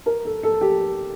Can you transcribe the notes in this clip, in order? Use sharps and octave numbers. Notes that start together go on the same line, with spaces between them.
A#4
A4
A4
G4